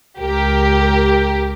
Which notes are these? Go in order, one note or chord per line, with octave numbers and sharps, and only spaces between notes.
C#2 G4 A#4